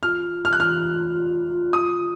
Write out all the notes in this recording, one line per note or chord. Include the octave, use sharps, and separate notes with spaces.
F4 F6
F6
F#6
F6
D#6